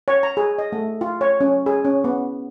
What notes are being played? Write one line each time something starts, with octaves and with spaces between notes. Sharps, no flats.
C#5
A#5
G#4
D#5
A3
F4
C#5
C#4
G#4
C#4
B3